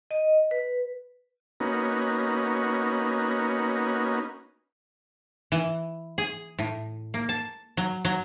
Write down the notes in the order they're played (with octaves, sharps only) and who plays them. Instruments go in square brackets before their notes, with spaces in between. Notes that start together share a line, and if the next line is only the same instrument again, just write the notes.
[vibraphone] D#5
B4
[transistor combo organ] A#3 B3 C#4 D#4 F#4
[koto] E3
G#4
A2
A#3
A5
F#3
F#3